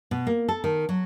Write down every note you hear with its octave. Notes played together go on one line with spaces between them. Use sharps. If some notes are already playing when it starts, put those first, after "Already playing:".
B2
A#3
A4
D#3
F#3